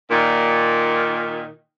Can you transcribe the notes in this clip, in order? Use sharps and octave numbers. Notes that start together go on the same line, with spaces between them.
A#2 D#3